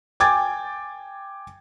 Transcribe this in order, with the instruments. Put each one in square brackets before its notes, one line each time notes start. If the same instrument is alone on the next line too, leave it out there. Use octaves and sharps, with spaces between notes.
[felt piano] G5 G#5 D6 G#6 A6